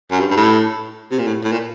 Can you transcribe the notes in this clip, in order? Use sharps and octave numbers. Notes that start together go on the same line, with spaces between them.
F#2
G2
G2
A2
C3
A#2
A2
A2
A#2